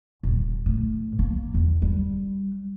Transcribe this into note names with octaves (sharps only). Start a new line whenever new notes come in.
D#1
A2
A#3
E2
G3